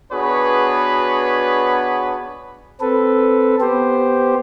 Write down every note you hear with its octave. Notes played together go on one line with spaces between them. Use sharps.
B3 D4 F#4 G#4 B4 C#5
C4 A4 B4
B3 G4 C5